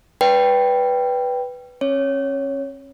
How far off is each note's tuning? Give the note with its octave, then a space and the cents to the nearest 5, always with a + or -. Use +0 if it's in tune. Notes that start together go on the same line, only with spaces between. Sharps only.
B4 +0 D5 -25 G5 +0
C#4 -35 C#5 +0